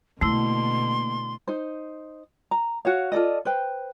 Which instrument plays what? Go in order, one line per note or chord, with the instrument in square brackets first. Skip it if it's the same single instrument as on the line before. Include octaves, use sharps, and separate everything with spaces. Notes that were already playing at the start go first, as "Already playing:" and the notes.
[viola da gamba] B2 D3 [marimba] A3 E4 [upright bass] A#3 [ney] C6
[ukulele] D#4 C5
A#5
F#4 C#5 F5
F4 A4 D5 D#5
B4 C5 G5